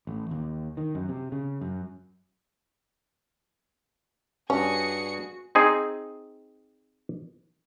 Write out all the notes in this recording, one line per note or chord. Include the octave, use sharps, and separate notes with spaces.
A1
D#2
D#3
F#2
C3
C#3
F#2
G2 C#4 F#4 G#4 C#7
C4 D#4 G#4